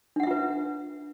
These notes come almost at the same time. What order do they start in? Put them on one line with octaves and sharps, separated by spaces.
D4 F#5 E5 F4 B4